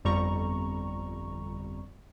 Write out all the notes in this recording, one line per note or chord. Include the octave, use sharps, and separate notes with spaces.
G1 F2 G3 A#5 C#6